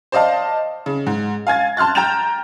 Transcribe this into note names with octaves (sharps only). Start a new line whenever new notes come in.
C5 D5 D#5 F5 A5
C#3
G#2
F5 G#5 G#6 A6
A5 C6 F6 F#6 A6
G5 A#5 G6 A6 E7 F7